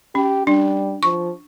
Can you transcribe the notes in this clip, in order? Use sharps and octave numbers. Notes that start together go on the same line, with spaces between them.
C#4 G4
G3 D4
F3 C#6